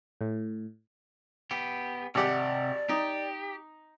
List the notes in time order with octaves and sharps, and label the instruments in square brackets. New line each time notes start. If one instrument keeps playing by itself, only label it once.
[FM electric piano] A2
[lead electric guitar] B3 G4
[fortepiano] G#1 G4 [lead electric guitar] C3 F#5 [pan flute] D5
[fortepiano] D#4 [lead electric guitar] G4